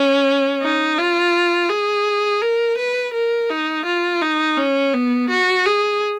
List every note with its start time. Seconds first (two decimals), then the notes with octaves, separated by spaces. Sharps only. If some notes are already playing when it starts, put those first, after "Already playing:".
Already playing: C#4
0.62 D#4
0.98 F4
1.69 G#4
2.42 A#4
2.78 B4
3.13 A#4
3.50 D#4
3.86 F4
4.22 D#4
4.57 C#4
4.94 B3
5.30 F#4
5.66 G#4